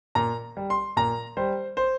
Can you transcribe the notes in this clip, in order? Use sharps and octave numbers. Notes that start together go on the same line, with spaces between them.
A#2 A#5
G3
C6
A#2 A#5
G3 C5
C5